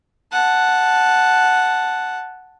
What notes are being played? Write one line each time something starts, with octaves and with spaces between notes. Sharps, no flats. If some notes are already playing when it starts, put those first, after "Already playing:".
F#5 A5